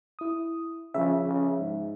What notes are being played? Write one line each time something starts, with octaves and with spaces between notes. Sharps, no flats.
E4 D#6
C#3 F3 E5
C#3
G#2